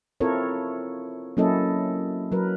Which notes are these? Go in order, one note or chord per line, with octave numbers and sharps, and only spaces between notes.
C4 E4 F4 A4 A#4 C#5
F#3 A#3 C#4 E4 A4 D#5
F#3 A#4 B4